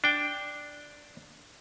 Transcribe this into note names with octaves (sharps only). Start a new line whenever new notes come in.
D4 G5